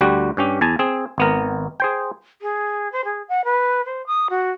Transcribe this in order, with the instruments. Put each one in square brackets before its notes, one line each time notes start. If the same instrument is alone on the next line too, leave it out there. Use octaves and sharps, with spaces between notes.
[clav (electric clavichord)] D2 G3 F#4 G4
G2 C#4 G4
E2 G#5 A5
C4 G#4
G#1 B3 A#4
G#4 C5 G5
[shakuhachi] G#4
C5
G#4
F#5
B4
C5
D#6
F#4